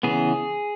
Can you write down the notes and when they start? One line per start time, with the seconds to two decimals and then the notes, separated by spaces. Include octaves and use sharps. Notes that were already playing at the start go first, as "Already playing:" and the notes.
0.03 C#3 E3 B3 G#4